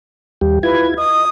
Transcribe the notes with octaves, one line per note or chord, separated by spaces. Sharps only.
D#2 G3 G4
E4 F4 B4 G#6
D#5 D#6